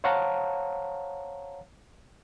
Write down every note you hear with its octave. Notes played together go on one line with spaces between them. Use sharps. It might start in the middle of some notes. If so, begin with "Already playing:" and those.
C5 C#5 F5 F#5 A5 A#5